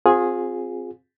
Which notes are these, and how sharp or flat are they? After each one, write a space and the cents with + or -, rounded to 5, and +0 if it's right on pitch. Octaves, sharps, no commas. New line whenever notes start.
C4 +10 F4 +35 G#4 +0